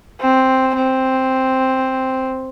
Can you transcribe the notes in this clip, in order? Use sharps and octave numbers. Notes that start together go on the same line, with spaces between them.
C4
C4